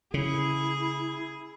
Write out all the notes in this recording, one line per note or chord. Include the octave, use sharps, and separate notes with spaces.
C#3 E4 G#4